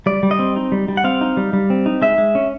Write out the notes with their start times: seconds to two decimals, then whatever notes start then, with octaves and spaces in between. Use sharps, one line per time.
0.06 G3 D5
0.23 G3
0.31 D#5
0.39 C4
0.56 D#4
0.72 G3
0.88 G3
0.97 F#5
1.04 C4 F5
1.21 D#4
1.37 G3
1.53 G3
1.70 C4
1.86 D#4
2.02 G#3 E5
2.18 G#3
2.35 C#4